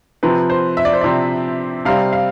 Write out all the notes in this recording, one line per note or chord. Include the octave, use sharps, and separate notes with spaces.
C3 F3 C4 B4
C5
E5
D5
C5
C3 F3 C4 D5
C3 G3 C4 F5
F5